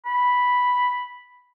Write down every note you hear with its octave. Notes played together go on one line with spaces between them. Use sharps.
B5